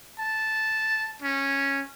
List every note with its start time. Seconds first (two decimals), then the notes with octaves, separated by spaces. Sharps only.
0.19 A5
1.22 C#4